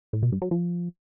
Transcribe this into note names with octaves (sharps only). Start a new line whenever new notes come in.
A2
B2
G2
F#3
F3